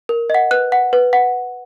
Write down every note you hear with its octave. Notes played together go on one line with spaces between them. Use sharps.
A#4
D#5 F#5
B4 F#6
F#5
B4
F#5